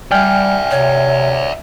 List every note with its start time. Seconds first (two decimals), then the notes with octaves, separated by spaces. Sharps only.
0.11 G3 D5 E5 G5 G#5 F6
0.71 C3 C#5